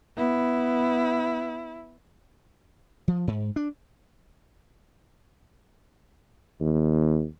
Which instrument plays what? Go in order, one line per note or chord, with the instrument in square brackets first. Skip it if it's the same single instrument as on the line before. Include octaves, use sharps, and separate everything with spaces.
[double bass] B3 [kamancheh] E4
[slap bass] F3
G#2
D4
[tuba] D#2